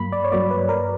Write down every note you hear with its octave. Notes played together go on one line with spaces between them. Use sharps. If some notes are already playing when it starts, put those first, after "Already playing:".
Already playing: G2 F#3 A#3 B5
D5
C#5
G2 F#3 A#3 D5
B4
A#4